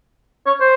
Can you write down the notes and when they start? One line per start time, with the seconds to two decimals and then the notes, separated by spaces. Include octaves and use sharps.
0.46 C#5
0.61 C5